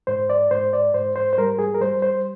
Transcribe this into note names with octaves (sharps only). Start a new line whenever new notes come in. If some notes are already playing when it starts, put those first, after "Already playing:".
G#2 C5
D5
G#2 C5
D5
G#2 C5
C5
C5
G3 A#4
G#4
A#4
G3 C5
C5